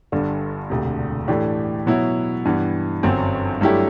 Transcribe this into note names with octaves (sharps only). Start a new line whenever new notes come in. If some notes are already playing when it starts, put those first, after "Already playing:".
G1 G2 D3
E1 D2 C3
A2 E3 A3 D4 G4
B2 F#3 B3 E4
G2 E3 B3
G1 F#2 F#3 C4
G2 F#3 A3 E4 G4